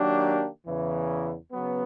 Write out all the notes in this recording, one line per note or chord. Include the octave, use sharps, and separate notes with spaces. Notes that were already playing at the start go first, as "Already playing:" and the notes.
Already playing: D#3 F#3 A#3 D4 G4
E2 C#3 E3
C#3 F#3 B3